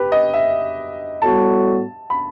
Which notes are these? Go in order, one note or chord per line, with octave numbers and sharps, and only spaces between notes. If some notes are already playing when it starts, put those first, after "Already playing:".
Already playing: G4 B4
D#5
E5
A2 G3 B3 F#4 A5
B5